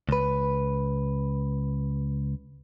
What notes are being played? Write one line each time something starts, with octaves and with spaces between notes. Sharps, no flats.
C#2 B4